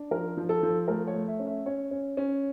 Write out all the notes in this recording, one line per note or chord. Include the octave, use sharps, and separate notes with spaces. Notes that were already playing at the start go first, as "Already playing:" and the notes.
Already playing: D4
F3 A#4
F3
A4
F3
A3 A#4
C#5
A3
E5
C#4
E5
C#4 C#5
C#4
C#4